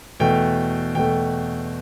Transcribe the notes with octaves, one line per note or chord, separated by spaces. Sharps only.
E2 B2 A3 G5
E2 B2 A3 G5